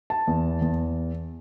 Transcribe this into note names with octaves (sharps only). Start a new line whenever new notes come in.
A5
E2
E2